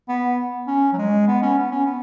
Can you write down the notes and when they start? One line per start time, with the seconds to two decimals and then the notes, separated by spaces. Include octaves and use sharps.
0.08 B3
0.67 C#4
0.93 F#3
0.98 G#3
1.28 B3
1.42 C#4
1.58 B3
1.71 C#4
1.86 B3